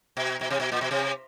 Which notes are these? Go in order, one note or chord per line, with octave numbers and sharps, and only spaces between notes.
B2
B2
C3
B2
A#2
B2
C3